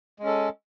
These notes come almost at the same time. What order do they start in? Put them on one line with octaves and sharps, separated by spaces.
G#3 C#4 A4